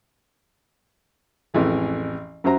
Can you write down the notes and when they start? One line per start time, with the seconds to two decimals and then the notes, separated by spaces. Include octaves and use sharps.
1.54 A1 F2 E3 G#3
2.44 F#2 F#3 C#4 C5 E5 A#5